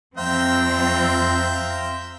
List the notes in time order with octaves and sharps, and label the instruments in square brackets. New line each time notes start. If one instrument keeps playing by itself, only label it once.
[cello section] F2 C4 [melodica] C5 F5 [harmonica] E5 G5 A#5